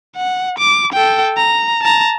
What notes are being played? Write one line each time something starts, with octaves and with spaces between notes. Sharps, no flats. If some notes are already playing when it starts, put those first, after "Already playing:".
F#5
D6
A4 G5
A#5
A5 A#5